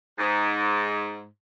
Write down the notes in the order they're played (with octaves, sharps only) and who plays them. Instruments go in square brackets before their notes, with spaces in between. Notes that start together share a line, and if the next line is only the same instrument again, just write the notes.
[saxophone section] G#2